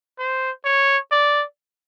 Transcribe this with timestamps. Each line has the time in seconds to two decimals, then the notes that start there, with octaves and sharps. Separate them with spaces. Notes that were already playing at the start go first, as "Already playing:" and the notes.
0.19 C5
0.65 C#5
1.11 D5